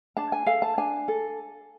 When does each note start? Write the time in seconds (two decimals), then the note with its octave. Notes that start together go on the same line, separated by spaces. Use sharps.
0.17 D4 A5
0.32 G#5
0.46 A4 F5
0.62 A5
0.77 D4 G#5
1.08 A4